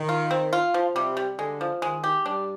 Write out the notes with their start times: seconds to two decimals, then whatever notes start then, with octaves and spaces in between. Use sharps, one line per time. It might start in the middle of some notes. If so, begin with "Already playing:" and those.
Already playing: D#3
0.09 F4
0.31 C4
0.53 F4
0.74 F3
0.95 C3 G3
1.17 G3
1.38 D3 G#3
1.61 F3
1.82 D#3 G#3
2.04 G4
2.25 G2 G3 D4